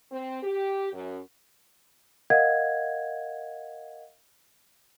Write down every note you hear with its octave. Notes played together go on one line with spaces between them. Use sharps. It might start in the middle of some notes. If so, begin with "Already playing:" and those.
C4
G4
F#2
A#4 D#5 F5 F#5 G#6